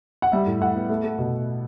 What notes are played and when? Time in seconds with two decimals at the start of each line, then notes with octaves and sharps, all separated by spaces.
0.22 F#5
0.32 G3 E5
0.46 A2
0.60 A2 F#5
0.76 B3
0.89 A3
1.03 A3
1.18 B2